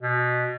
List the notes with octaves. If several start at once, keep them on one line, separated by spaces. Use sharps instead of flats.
B2